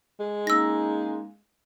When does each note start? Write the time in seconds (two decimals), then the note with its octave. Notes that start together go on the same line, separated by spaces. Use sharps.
0.20 G#3
0.47 A#3 C#4 D#4 E6 A#6